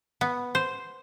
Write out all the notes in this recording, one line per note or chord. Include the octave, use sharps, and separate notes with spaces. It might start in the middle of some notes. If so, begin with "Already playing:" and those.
B3
C5